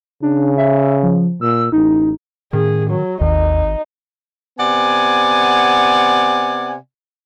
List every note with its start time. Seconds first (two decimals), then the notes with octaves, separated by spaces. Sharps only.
0.22 C#3 D4
0.58 E5
1.03 F3
1.41 A#2 E6
1.72 A1 D#4
2.53 A2 D#3 C#4 G#4
2.90 F#3
3.21 G#1 D#2 D#4
4.59 C3 B3 D5 F#5 G#5